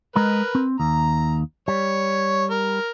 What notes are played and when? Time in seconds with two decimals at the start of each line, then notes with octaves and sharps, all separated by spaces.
0.16 G#3 A#4 B4 D#5 A#5
0.55 C4
0.80 D#2 A#5
1.68 G3 C#5
2.50 A#4